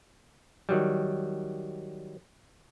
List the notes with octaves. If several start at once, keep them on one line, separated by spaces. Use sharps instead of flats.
D#3 F#3 G3